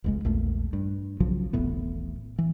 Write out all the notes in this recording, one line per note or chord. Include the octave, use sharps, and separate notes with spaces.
F1 C#2 G#3
A#1 E2 A3
G2
B1 C#3 F3 F#3
D#1 A1 A2 B3
E3